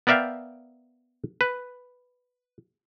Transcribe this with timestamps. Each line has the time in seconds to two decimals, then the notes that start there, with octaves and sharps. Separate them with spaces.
0.07 B3 A#4 D5 E5 F5 G5
1.41 B4